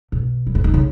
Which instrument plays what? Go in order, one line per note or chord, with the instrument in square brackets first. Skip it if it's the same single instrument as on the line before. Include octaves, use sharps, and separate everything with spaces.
[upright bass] B2
G3
E3
D#3
C#3